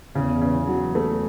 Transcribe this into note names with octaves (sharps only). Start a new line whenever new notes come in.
E2 C#3
C#3
E2 F#3
A3